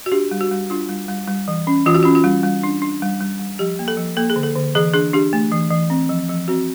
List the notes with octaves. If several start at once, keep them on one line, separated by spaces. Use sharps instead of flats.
F#4
D4 G4
G3
F#4
G3
D4 F4
G3
G3
G3
E3
C#4
E3 F4
F#4
C#4 F4
F4
G3
G3
D4
D4
G3
G3
G3
F3 G4
A#3
A4
F3
A#3 A4
G#4
D3
A4
D3
E3 G#4
D4 G#4
D4 G4
A3
E3
E3
C4
F3
F3
C4 F#4